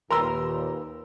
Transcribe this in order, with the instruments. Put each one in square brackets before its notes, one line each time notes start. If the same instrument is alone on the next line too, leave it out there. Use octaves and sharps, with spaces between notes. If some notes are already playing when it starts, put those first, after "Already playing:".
[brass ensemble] D#2 A#2 [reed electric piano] A#4 B4 [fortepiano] A#5 C6 E6